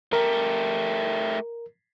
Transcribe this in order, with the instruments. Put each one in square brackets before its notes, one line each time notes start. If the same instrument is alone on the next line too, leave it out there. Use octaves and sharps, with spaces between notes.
[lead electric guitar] A3 G4 [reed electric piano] A#4